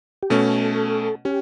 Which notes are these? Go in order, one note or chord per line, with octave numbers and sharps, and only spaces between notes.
G4
B2 A3 C#4 A4
C#4 G4